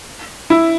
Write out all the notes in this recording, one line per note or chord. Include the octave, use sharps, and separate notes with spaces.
E4